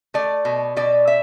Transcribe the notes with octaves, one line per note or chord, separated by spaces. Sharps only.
A3 D5
B2
B2 D5
E5